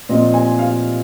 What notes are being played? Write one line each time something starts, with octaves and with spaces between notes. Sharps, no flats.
A#2 F3 C4 F4 D#5
G#5
F5